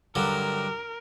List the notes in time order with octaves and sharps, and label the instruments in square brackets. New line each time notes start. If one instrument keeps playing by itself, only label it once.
[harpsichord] G2 D3 F#3 [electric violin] A#4